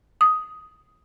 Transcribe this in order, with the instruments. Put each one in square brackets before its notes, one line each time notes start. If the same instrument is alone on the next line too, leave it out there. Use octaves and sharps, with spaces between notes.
[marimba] D#6